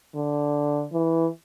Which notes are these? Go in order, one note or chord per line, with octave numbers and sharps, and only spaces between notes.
D3
E3